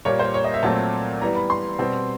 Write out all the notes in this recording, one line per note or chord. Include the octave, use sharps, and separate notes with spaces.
A#2 G3 A#3 C#5
C5
C#5
D#5
E5
A#2 F#3 A3 C4 A5
E3 G3 B3 A#5
B5
C6
B2 G3 C4